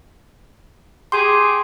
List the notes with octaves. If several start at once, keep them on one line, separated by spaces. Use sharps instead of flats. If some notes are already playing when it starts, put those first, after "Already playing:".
G4 G#4 C6